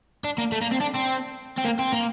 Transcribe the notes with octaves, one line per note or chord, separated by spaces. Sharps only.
D4
A#3
A3
A#3
C4
D4
C4
C4
A#3
C4
A#3